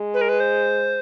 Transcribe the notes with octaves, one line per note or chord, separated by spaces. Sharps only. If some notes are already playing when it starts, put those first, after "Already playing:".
Already playing: G#3
B4
A#4
B4
C5